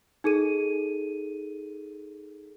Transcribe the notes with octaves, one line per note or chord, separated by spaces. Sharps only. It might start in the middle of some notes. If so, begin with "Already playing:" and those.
D#4 G#4 A4 D#7